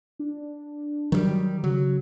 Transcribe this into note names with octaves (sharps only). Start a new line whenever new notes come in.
D4
D#3 E3 F#3 G3
C#3 F#3